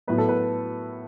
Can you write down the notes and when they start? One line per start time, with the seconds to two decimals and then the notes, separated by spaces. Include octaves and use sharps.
0.07 A2 F#3 B3 B4
0.18 A4
0.29 B4